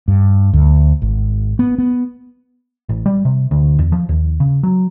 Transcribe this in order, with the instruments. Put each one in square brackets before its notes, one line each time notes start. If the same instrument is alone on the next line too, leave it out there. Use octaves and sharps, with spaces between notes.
[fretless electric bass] G2
D2
G#1
B3
B3
[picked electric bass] A1
G3
C3
D2
E2
F3
D#2
C#3
F#3